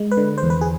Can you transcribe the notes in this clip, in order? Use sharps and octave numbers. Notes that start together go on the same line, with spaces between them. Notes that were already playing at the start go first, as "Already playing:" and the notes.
Already playing: G#3
B4
D3
C5
E2
B4
G#4